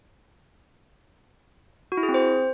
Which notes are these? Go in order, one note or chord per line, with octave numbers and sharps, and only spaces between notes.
F#4
E4
G#4
C4
C5